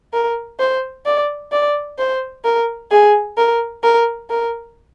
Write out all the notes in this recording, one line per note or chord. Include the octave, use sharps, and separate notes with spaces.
A#4
C5
D5
D5
C5
A#4
G#4
A#4
A#4
A#4